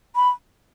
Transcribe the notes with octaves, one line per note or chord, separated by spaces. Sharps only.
B5